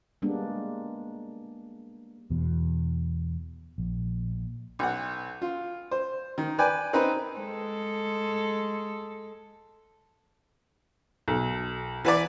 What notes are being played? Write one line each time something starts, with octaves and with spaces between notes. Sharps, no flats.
G3 G#3 A#3 B3 D4
E2 B2
A#1
B1 F#5
F4
C5
D#3
B4 D5 G5 G#5
C4 D#4 A#4 B4
G#3 A4
B1
E3 B4 D5